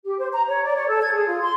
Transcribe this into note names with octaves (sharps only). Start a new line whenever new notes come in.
G4
C5
A#5
C#5
D5
C#5
A4
G#6
G#4
F4
C6